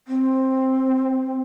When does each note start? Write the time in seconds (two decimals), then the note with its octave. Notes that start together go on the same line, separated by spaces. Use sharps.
0.08 C4